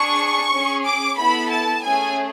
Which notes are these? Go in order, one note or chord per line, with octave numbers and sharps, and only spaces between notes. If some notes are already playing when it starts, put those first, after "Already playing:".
Already playing: D4 G#4 C#6
C#4 G#4
D6
B3 E4 A4 B5
A5
A3 C#4 G#4 G#5